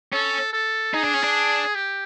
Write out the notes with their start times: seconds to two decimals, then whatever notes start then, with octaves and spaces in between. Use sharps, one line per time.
0.13 C#4 A4
0.53 A4
0.94 D#4 G#4
1.04 D4
1.14 C#4
1.24 D4
1.75 G4